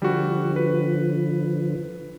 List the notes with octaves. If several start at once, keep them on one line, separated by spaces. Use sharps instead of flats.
D3 F3 G3 F#4
B4